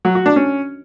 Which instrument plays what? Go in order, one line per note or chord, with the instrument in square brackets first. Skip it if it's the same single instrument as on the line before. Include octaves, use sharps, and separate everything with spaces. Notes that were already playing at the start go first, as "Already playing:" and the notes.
[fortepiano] F#3
F#4
D4
C#4